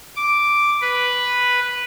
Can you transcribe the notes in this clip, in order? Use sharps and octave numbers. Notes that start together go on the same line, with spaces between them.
D6
B4